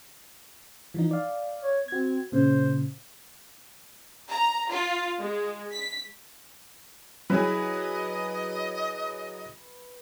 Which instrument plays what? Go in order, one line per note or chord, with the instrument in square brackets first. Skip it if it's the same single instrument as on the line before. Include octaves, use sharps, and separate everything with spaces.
[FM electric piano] E3 F3 D#4
D5 F5
[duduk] C#5
[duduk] C4 [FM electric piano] F#4 G#6
[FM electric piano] A#2 C#3 [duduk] C5
[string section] A#5
F4
G#3
B6
[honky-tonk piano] F#3 E4 G#4 [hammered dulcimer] B4 [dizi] D#5